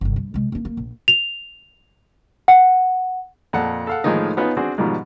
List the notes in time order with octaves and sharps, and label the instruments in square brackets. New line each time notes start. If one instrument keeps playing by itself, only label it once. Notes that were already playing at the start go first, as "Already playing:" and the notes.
[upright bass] G1 C2
G2
C3 G#3
A#3 D4
A#3
A#1
[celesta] F7
F#5
[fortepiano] F2 A#2 F#5 A5
A4 F5 F#5
A2 D#3 F3 G#3 A#3 D#4
B3 C#4 D#4 F4 B4
C4 D4 F#4 G#4 C5
G#2 B2 D#3 F3 G3